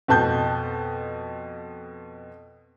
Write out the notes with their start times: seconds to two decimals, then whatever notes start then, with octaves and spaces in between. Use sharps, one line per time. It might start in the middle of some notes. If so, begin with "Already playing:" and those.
0.08 F2 B2 A5 G6